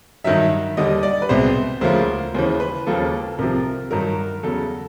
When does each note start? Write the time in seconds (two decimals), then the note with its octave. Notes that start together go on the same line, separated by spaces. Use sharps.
0.24 G2 D#3 F#3 E5
0.77 D#2 D3 G3 D#5
1.03 D5
1.22 B4
1.29 C2 B2 G#3 B3 C5
1.81 D2 C#3 F3 A#3 C5
2.34 D#2 C#3 E3 C5
2.60 B4
2.87 D#2 C#3 F3 A#3 A4
3.39 C2 C3 F3 A#4
3.91 G2 D#3 F#3 A#4
4.43 E2 C#3 F#3 A4